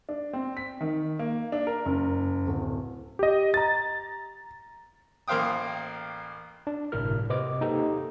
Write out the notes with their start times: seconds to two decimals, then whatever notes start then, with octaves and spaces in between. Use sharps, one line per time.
0.09 D4
0.33 C4
0.57 B6
0.81 D#3
1.19 A#3
1.52 D4
1.67 A#4
1.86 F#1
2.47 D1
3.19 G4 D#5
3.54 A#5 A6
5.28 A1 A#3 C5 F5 G5 D#6
6.67 D4
6.92 G1 A2 C3 E4 A#4 F6
7.30 C3 B4 C5 D#5 D6
7.61 A#3 D#4 G4 A4